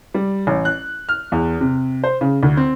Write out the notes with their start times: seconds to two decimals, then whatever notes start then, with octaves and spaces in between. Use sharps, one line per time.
0.14 G3
0.47 A1
0.65 F#6
1.09 F6
1.32 E2
1.61 C3
2.04 C5
2.21 C#3
2.43 D2
2.57 C4